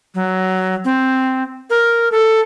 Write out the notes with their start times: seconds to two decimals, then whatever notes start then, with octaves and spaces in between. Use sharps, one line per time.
0.15 F#3
0.85 C4
1.70 A#4
2.12 A4